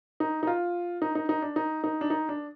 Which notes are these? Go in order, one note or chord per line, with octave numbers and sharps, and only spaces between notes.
D#4
D#4
F4
D#4
D#4
D#4
D4
D#4
D#4
D4
D#4
D4